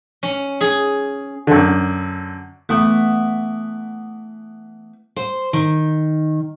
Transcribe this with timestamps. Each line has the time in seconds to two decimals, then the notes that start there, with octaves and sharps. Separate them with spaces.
0.23 C#4
0.61 G#4
1.47 F#2 D3
2.69 E3 A3 B3
5.16 C5
5.53 D#3